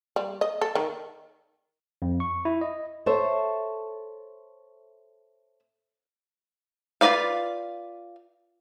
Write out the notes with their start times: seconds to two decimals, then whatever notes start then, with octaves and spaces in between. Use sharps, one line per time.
0.16 G3
0.41 D#5
0.61 A4
0.75 D#3
2.02 F2
2.20 C#6
2.45 E4
2.61 D#5
3.06 A4 C5 C#5 E5
7.01 F4 F#4 B4 D5 F5